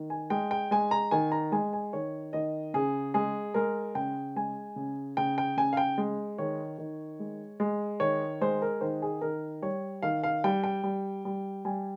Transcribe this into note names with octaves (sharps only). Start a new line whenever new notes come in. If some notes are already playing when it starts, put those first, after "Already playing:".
Already playing: D#3
G#5
G#3 G5
G5
G#3 G#5
A#5
D#3 G#5
A#5
G#3 G#5
G#5
D#3 C#5
D#3 D#5
C#3 G#4
G#3 G#4
G#3 A#4
C#3 G5
G#3 G#5
C#3
C#3 G5
G5
C#3 G#5
F5
G5
G#3
D#3 C#5
D#3
G#3
G#3
D#3 C#5
G#3 C5
A#4
D#3 C5
G#4
D#3 A#4
G3 C#5
D#3 F5
F5
G3 G5
G5
G3
G3
G3 G#5